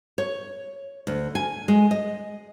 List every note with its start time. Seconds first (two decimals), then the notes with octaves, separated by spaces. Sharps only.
0.18 C#5
1.07 D2
1.35 G#5
1.68 G#3
1.91 D#5